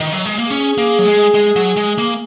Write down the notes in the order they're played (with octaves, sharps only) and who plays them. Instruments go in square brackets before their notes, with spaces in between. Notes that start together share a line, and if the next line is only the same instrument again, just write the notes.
[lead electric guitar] D#3
F#3
G#3
A#3
[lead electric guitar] C#4 [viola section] G#4
[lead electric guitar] A#3
F#3
G#3
G#3
F#3
G#3
A#3